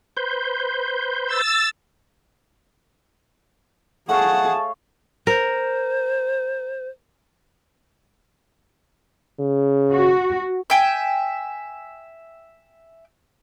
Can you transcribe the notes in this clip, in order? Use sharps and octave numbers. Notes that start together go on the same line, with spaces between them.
B4 C5 G6
E6 A6
A3 G#4 C#5 F5 F#5 A5
A#4 C5
C#3
F#4
E5 G5 G#5